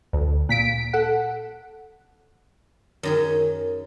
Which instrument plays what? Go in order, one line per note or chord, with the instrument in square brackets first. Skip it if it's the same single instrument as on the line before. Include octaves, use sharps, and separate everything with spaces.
[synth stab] D2
A#2 B6 D7
A4 F#5
[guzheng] F#2 D#3 G#4